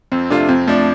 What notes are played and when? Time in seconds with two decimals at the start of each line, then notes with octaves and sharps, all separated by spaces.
0.12 F2 C4
0.30 C3 A3 D4 F4
0.49 F2 C4
0.67 F3 A3 D4